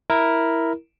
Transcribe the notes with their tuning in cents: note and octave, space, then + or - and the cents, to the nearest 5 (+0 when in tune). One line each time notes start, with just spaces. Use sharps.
E4 -5 A#4 +0